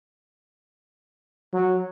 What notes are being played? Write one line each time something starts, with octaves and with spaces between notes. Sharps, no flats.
F#3